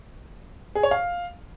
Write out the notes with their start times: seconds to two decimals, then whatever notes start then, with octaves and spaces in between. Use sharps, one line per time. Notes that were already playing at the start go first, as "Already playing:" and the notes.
0.75 G#4
0.83 C#5
0.91 F5